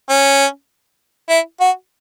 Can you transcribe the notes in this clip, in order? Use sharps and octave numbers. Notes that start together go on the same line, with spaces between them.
C#4
E4
F#4